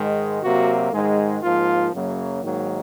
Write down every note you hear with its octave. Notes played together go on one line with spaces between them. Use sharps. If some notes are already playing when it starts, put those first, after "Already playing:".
Already playing: G#2 D#3 G#3
C3 F#3 A#3 F#4
G#2 D#3 G#3
G#2 F3 A#3 F4
F#2 C#3 F#3 A#3
G#2 D#3 F#3 A#3